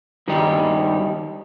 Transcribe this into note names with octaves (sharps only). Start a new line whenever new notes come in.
G2 D#3 G3 D#4 G4